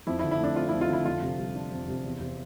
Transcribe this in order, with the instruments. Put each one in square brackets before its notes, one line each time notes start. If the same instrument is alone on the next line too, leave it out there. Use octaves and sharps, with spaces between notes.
[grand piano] F2 [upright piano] E4
[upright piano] E4
[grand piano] D3
[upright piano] E4
[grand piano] A3 [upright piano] D4
[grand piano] C4 [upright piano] F4
[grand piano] F2 [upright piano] E4
[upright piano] F4
[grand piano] D3 [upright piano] E4
[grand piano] F2 [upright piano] F4
[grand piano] C3
G3
D4
F2
C3
E2
C3